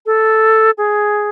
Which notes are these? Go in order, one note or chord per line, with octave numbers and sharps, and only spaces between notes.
A4
G#4